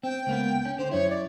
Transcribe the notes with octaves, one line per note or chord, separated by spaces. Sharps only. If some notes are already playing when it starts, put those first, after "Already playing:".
C4 G5
C#2 A#3 B3
C#4
D3 C5
F#2 E4 C#5
D5